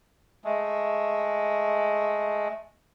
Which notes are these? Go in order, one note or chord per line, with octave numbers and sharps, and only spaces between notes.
G#3 A3